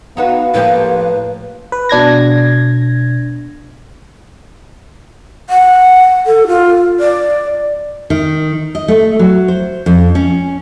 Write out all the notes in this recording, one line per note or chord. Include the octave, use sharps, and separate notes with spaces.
B3 D#4 F#4 B4 F5
A2 F3 A#3 G4 B4
B4
B2 D4 G#6 A#6
F#5
A4
F4
D5
D#3
D#5
A3
F#3
C5
F2
C#4